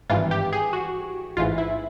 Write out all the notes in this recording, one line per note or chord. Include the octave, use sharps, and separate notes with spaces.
G#1 G2 E3 F4
G4
G#4
F#4
A1 G#2 E3 F4
E4